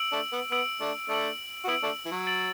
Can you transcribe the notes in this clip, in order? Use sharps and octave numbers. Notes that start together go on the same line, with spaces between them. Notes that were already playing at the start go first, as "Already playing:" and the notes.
Already playing: E6 D7 F#7
A3 D4
B3
B3 E6 D7 F#7
A3 D4
A3 D4 E6 D7 F#7
F#4
B3 E4 E6 D7 F#7
A3 D4
E3
F#3
A6 D7 F#7